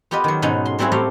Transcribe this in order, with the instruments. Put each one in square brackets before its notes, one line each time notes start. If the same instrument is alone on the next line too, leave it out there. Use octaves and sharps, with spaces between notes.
[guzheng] B3 F4 G4 B4 D#5
D#3 F#3
G#2 B2 F#3 C#4 D#4 F#4
C6
F#3 G3 C4 E4 F#4 G#4
A2 G3 A3 G4 F5 A#5